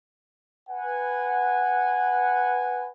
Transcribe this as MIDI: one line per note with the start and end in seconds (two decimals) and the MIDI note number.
0.70 2.89 71
0.70 2.89 78
0.70 2.89 80